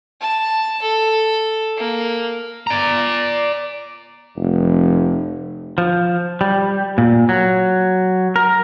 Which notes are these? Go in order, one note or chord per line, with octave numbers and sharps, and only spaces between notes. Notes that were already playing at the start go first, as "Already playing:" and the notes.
A5
A4
A#3
D5 A#5
F1
F3
G3
A#2
F#3
A#4